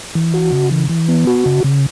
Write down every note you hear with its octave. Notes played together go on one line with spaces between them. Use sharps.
E3
F#4
C#3
E3
E3
B3
F#4
C#3
C#3